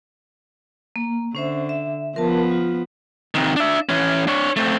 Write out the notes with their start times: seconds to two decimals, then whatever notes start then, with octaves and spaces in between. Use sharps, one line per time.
0.96 A#3
1.35 D3 C#4 C5 E5
1.69 E5
2.16 F3 B3 A#4 A5
2.51 F4
3.35 C3 D#3
3.56 D4 E5
3.89 E3 C#4
4.27 D4 C#5
4.56 A3 C4